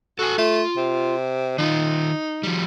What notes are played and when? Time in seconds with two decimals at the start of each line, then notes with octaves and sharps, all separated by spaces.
0.19 F#4 A4 G#5
0.38 A3 F4
0.77 C3
1.58 D#3 D#4 F4
2.43 F3 G3